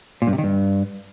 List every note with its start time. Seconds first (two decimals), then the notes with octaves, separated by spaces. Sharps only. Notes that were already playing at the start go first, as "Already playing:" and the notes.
0.22 A#2
0.27 G2
0.33 C3
0.38 D#3
0.44 G2